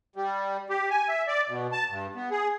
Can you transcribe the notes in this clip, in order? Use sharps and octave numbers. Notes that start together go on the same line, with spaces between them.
G3
G4
G#5
E5
D5
B2
A5
G2
B3
G#4